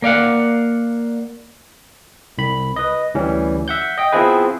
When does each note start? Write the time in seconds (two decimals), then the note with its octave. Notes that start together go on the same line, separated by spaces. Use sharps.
0.02 A#3 D5 F5 F#5
2.38 C2 B5
2.76 B4 D#5
3.14 D2 E3 G3 C#4
3.68 E5 F#5 G6
3.98 D#5 G5
4.12 F3 B3 C4 E4 G#4 B4